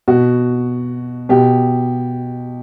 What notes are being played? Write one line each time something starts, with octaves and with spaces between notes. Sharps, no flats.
B2 F#4
B2 G4